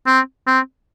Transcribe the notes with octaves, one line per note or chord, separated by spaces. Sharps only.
C4
C4